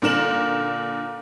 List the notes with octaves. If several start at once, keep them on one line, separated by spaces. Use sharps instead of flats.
A#2 D3 A#4 E7 F#7